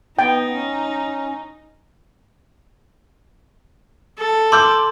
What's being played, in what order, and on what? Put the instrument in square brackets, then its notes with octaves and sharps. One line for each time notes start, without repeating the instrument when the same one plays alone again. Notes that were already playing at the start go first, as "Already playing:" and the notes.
[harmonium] B3 [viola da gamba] D#4 [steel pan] G5
[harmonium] C#4
[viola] A4
[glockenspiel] C6 [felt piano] D6 E6 G6